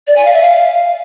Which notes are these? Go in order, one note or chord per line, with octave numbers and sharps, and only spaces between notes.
D5
G#5
F5
E5
F5